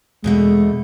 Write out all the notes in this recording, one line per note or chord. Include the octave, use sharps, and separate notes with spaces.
E2 B2 G#3 A3